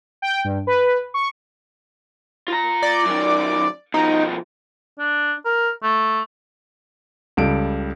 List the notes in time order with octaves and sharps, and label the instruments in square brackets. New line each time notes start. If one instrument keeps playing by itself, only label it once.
[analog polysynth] G5
G2
B4
C#6
[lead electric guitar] F4 A#5
[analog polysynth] D5
[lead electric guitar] F#2 D#3
[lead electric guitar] B2 F3 [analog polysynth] D#4
[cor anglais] D4
A#4
A3
[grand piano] C#2 G3 A4 D7